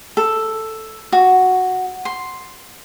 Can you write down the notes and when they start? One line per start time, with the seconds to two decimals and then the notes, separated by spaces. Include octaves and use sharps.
0.17 A4
1.12 F#4
2.05 C6